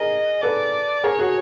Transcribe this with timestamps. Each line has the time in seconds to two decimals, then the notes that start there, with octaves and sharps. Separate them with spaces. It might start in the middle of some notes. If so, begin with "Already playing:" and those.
Already playing: G#4 A#4 D#5
0.42 A4 B4 D5
1.04 G#4 A#4 C#5
1.19 F#4 G#4